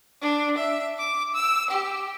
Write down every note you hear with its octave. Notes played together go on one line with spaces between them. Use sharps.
D4
E5
D6
E6
G4